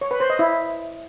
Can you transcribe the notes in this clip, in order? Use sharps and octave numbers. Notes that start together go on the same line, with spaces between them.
C#5
B4
C5
D#5
E4